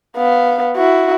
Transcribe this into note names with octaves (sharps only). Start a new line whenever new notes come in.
B3 F5
E4 F#4